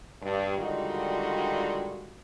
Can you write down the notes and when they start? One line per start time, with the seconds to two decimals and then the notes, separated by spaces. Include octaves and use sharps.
0.22 G2
0.57 D3 D#3 G3 G#3 F4 F#4